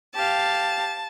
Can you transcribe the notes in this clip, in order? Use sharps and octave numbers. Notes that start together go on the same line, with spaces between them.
G4 F5 A5